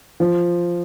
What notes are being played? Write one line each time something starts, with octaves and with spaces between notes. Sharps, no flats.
F3